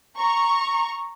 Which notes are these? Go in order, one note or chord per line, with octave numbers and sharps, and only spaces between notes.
A#5 C#6